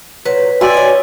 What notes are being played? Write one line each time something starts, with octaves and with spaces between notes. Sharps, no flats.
A#2 F#3 B4
F#4 D5 E5 G5 G#5 C6
C#4 D#5